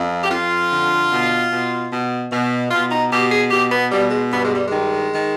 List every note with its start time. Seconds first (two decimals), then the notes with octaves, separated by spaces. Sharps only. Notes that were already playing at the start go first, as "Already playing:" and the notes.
Already playing: F2
0.24 G4
0.30 F2 F4
0.70 D3
1.11 B2
1.50 B2
1.91 B2
2.32 B2
2.71 B2 F4
2.91 D#4
3.12 B2 G4
3.32 G#4
3.51 B2 G4
3.72 B3
3.92 B2 G3
4.11 G#3
4.32 G2 B3
4.44 G#3
4.56 G3
4.67 D#3 G#3
5.12 D#3